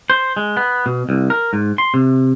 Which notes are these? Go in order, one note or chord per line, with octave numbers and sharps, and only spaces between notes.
C5
G#3
B3
B2
C2
A#4
G#2
C6
C3